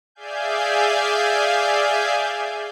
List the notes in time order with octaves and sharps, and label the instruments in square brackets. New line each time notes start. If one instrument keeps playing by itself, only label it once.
[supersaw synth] G#4 D5 E5 F5 G#5 G6